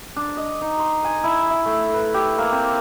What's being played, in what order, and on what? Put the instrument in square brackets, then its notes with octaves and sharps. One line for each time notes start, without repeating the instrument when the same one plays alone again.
[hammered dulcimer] D4
D#5
D#4
C6
G#5
E4
E5
A3
B4
G4
A#3
C4